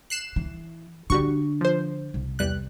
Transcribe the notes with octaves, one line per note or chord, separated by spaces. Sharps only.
F#6 C7 E7
E3
D3 G3 D4 F#4 C#6
F3 C5
C2
E2 G3 F#6